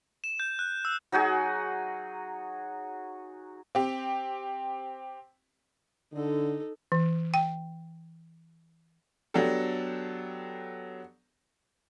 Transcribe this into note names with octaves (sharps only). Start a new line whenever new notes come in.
E7
G6
F#6
E6
F#3 D#4 F#4 G#4
C4 G4
D3 D#4 A4
E3
G5
F#3 B3 D4 G4 A4